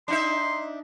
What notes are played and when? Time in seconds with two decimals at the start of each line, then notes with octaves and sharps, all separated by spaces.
0.08 D4 D#4 E5 C6